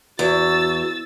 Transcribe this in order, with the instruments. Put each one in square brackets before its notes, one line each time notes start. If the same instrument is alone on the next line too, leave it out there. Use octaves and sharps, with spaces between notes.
[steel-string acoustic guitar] E2 [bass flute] F#4 [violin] E6 A6